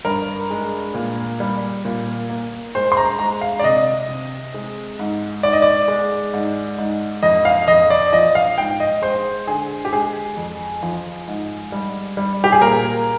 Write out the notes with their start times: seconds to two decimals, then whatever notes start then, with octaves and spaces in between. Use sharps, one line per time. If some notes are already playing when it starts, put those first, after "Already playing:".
0.05 G2 A#4
0.51 G#3
0.94 A#2
1.40 G3
1.85 A#2
2.30 A#3
2.75 G#3 C5
2.92 C6
2.97 A#5
3.19 G#3 A#5
3.41 F5
3.59 D5
3.64 C3 D#5
4.09 C3
4.54 G#3
4.99 G#2
5.43 G#2 D5
5.53 D#5
5.62 D5
5.88 G#3
6.34 G#2
6.78 G#2
7.22 F2 D#5
7.45 F5
7.68 F2 D#5
7.90 D5
8.12 F3 D#5
8.35 F5
8.58 G#2 G5
8.80 D#5
9.02 G#3 C5
9.47 D3 G#4
9.85 G4
9.92 G#3 G#4
10.37 F2
10.83 F3
11.27 G#2
11.72 G3
12.17 G3
12.44 G4
12.52 G#4
12.61 A#2 A#4